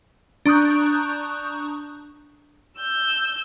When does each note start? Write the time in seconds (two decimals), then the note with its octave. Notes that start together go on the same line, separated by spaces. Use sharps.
0.46 D4 A#5 C#6 D#6 F#6 G6
2.79 E6 G6